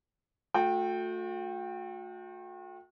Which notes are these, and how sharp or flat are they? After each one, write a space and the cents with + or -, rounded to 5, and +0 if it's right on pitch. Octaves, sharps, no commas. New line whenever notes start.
A3 +0 F#4 -40 G5 +0